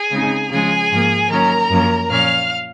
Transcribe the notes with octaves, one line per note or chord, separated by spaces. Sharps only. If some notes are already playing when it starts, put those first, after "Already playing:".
Already playing: G#4 G#5
C#3 G#3 C4 D#4
C#3 F3 G#3 G#4 G#5
G#2 F3 A#3
D#3 F#3 A#3 C#4 A#4 A#5
F#2 F3 A#3 C#4
A#2 F3 A#3 C#4 F5 F6